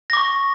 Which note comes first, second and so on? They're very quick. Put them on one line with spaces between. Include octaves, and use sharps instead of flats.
A#6 D6 C#6